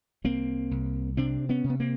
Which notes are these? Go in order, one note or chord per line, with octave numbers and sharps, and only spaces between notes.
C2 A#3 C4
C2
C3 C4 D4
B3 C#4
C3
B3
A#3 C4